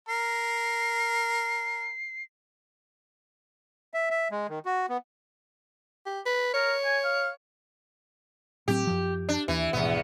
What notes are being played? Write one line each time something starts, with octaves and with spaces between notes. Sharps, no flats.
A#4 C7
E5
E5
G#3
D#3
F#4
B3
G4
B4
A#4 C#5
G#5
F5
A2 F#3 C4 G4
F#2 F3
D4
D#2 E3
D#1 G#1 E2 B2 B3